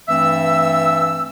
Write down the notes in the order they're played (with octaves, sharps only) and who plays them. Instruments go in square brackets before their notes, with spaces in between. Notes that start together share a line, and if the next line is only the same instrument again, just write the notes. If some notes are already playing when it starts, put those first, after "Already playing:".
[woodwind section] G2 E3 A3 C4 E5 E6